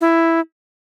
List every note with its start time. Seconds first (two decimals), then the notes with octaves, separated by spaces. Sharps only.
0.01 E4